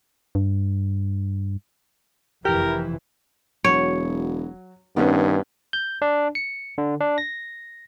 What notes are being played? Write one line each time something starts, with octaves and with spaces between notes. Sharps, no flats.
G2
F1 F2 E3 E4 G4 A#4
E1 F#3 C#5
G2 D#3 B3 C#4
G6
D4
C#7
D3
D4
A#6